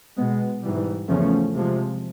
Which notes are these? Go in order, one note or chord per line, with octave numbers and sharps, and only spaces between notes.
B2 G#3 B3
G#2 E3 G3
E2 C#3 F3 A3 C#4
C3 F3 G#3